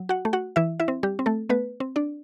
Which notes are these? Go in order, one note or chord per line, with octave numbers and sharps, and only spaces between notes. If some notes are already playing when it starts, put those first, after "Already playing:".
Already playing: F#3
F#4 F#5
A3
F#4 F#5
E3 E4 E5
E4 E5
C4
G3 G4
C4
A3 A4
A3 B3 B4
C4
D4 D5